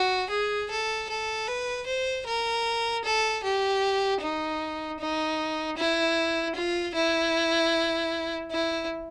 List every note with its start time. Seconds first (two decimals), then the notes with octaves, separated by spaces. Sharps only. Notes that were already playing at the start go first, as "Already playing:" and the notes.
Already playing: F#4
0.30 G#4
0.70 A4
1.09 A4
1.48 B4
1.86 C5
2.26 A#4
3.04 A4
3.43 G4
4.21 D#4
4.99 D#4
5.77 E4
6.55 F4
6.94 E4
8.51 E4